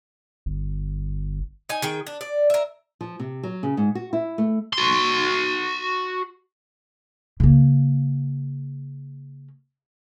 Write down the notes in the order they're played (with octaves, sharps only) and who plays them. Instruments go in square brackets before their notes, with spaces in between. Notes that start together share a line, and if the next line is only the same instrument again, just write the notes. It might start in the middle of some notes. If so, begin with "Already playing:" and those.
[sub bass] G1
[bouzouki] D#4 G#5
D#3 G#4 G5
D4
D5
A#4 E5
[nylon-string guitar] F3
C3
F#3
C#3
G#2
F#4
E4
A3
[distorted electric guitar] F#4 C6
[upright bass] C#3 A#3